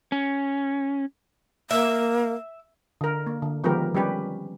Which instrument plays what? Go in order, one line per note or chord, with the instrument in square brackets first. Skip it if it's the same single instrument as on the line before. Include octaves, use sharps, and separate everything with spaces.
[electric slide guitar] C#4
[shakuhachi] A#3 [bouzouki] E5
[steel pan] D3 A#4
A#3
D3
D#3 F3 G#3 B3 G4 A#4
G3 C#4 G4 B4